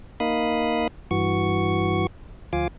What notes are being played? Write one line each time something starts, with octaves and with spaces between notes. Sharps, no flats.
A#3 D#4 F5 B5 D#6
G2 E3 F#4 C#6
D2 F3 F4 F5 G#5 D6